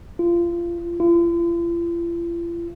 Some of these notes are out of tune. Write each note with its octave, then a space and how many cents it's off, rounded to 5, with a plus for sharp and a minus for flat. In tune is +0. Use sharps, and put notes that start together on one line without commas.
F4 -25
F4 -45